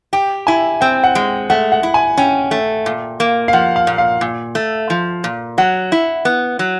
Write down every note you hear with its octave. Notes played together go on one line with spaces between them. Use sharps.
G4 G5
E4 G#5
C4 G5
F#5
G#3
A3 F#5
F#5
E4
G#5
C#4 G5
A3
A#2
A#3
F5
F3 F#5
F5
A#2
F5
A#2
A3
F3
A#2
F#3 F#5
E4
B3
F#3